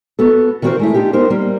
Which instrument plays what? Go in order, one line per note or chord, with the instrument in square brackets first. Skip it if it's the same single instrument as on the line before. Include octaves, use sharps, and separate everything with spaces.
[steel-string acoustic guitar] B3 F#4 A4
D#3 E3 C4 F#4 A#4 C5
G#3 A3 E4
D4 D#4 F4 G4
B3 D#4 A#4 C5
G3 A#3